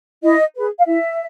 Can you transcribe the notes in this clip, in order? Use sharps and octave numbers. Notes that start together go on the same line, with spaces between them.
E4 D#5
G#4 B4
F5
E4 E5